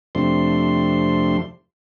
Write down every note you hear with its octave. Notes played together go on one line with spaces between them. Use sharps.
F2 C3 F3 A3 D4 C6